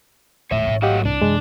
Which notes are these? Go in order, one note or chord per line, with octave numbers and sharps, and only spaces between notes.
D#1 A2 A3 C#5 E5
A1 G#2
F#3 A3 G4 D#5 F5 F#5
C2 D4
F#2 C3 E3 G#3